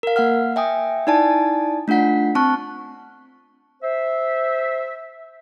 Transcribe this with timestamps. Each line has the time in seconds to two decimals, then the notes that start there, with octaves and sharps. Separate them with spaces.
0.03 A#4 F5
0.16 A#3 F5 F#5 F6
0.56 E5 G5 G#5 D#6
1.07 D#4 E4 D5 G#5 A5
1.88 A3 D4 F4 F#5 B6
2.35 C4 A5 C#6 F#6
3.83 C5 E5